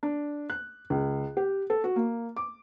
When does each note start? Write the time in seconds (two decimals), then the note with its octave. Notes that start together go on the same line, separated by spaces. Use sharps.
0.03 D4
0.50 F#6
0.90 C#2
1.37 G4
1.70 A4
1.84 F#4
1.96 A#3
2.36 D6